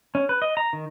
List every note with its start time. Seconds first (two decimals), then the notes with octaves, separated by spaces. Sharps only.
0.15 C#4
0.29 B4
0.42 D#5
0.57 A#5
0.73 D#3